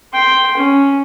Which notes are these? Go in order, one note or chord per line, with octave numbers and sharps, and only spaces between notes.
G5 C6
C#4